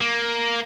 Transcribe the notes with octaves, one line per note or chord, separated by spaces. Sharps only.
A#3